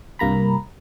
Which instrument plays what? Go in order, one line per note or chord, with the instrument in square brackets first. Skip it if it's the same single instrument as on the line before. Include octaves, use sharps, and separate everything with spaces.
[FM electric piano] C2 G2 A#3 A#5 B5